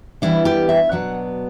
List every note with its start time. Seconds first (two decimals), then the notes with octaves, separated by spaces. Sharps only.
0.22 E3 G3 B3 D4 E4
0.45 G4
0.69 E5
0.92 B2 F#3 B3 D4 F#5